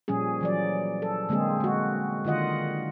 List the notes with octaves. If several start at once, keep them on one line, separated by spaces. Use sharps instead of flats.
A#2 F3 G3 C#4 G#4
E3 F#3 D5
A4
D3 G#3 A#3 C4 G#4
G#3 F#4
D3 D#3 F4 D#5 F#5